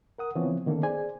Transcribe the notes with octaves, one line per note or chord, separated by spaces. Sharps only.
A#4 F#5 D#6
C#3 E3 F3 B3 C4 C#5
D3 D#3 A#3 B3 C#4 A4
G#4 C5 D5 G#5